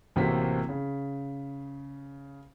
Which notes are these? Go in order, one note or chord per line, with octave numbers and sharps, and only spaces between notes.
A1 C3 A#3 C4 F#4 B6
C#3